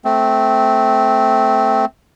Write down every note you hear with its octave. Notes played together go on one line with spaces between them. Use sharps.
A3 C4